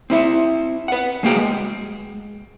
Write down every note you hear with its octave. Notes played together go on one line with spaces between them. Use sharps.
C4 E4 E5
B4 F#5
G#3 A#3 F#4 G#4 G5
G#3